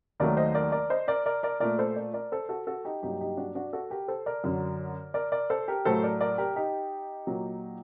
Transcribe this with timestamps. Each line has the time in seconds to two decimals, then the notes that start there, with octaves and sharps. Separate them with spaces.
0.20 D#2 D#3 F#3 A3 A#4 D5
0.37 C5 D#5
0.55 A#4 D5
0.72 A#4 D5
0.90 C5 D#5
1.08 A#4 D5
1.26 A#4 D5
1.43 A#4 D5
1.60 A#2 A3 A#4 D5
1.79 A4 C5
1.96 A#4 D5
2.14 A#4 D5
2.32 A4 C5
2.49 F#4 A4
2.67 F#4 A4
2.85 D#4 G4
3.02 G2 F#3 A#3 D#4 G4
3.20 D#4 G4
3.37 D4 F#4
3.55 D4 F#4
3.73 F#4 A4
3.90 G4 A#4
4.08 A4 C5
4.26 A#4 D5
4.44 F#2 D3 F#3
5.14 A#4 D5
5.32 A#4 D5
5.50 A4 C5
5.68 G4 A#4
5.85 A2 F#3 A3 A4 C5
6.03 A#4 D5
6.21 A#4 D5
6.38 G4 A#4
6.56 D#4 G4
7.27 A#2 F#3 A#3